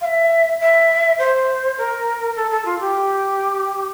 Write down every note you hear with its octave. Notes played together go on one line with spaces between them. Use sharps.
F5
E5
E5
C5
A#4
A4
A4
F4
G4